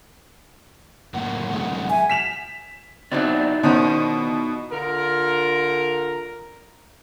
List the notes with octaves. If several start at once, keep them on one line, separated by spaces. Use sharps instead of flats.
F#2 A2 A#3 F#5
F#2 C3 G#3
E5 G#5
B6 E7 F7
B2 F#3 C4 D#4 E4 D5
B2 D#3 C#4 F#4 C5
D3 F4 A#4